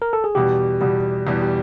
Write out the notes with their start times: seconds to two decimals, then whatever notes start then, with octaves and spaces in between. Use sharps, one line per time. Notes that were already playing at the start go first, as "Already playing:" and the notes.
0.02 A#4
0.13 A4
0.24 G#4
0.35 E2 B2 G3 G4
0.81 E2 B2 G3
1.27 E2 B2 G3
1.42 G4